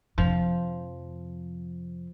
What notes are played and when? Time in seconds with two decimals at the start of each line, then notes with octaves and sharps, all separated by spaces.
0.18 F2 C3 F3